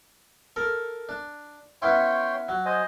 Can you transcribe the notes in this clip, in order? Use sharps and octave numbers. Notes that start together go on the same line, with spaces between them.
A4 A#4
D4
B3 C#4 E4 C#5 G5 C6
F#3
C5 D#5 G#5